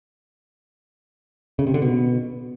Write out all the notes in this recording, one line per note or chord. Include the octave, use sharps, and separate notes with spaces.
C#3
C3
D3
B2